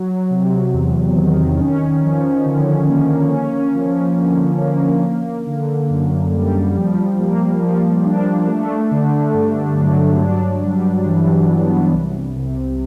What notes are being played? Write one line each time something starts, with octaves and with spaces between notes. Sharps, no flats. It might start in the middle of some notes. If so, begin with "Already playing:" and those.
Already playing: F#3
C3
E2
D#3
C#4
F3
D3
A#3
C#4
F3
D3
A#3
A#3
D3
F#2
G3
F3
A#3
F3
D4
A3
D3
G2
F#3
D4
G3
E3
B3
C2
C3